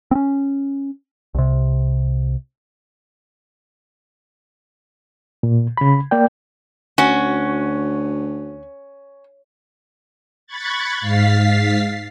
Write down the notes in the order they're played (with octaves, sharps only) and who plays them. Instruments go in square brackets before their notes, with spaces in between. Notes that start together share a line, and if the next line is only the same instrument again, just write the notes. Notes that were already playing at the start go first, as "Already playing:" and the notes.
[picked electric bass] C4 C#4
C2 C3
[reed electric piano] A#2
C#3 B5
A#3 D5 G5
[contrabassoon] D2 [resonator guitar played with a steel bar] C#4 [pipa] F#4
[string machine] B5 C#6 F#6 G#6 A6
G#2 F5 A6 B6 C7